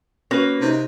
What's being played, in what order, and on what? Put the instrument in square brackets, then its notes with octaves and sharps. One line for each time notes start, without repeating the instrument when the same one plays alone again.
[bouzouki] A#3 B4 [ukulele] C#4 F#4
[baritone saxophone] C3 [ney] D#4